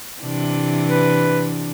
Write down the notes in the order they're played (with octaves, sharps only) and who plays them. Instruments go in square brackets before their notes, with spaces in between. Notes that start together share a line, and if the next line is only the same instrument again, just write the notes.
[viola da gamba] C3 E3 D4
[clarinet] B4